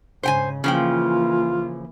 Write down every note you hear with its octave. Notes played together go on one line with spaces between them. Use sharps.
G#2 C#3 C5 G5 G#5
C#3 E3 F3 A#3 F4 G5